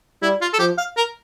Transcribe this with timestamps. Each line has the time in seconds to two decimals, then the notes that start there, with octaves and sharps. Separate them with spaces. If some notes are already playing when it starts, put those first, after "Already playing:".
0.22 G3 E4
0.41 F4
0.54 A4
0.59 F3 G4
0.78 F5
0.97 A#4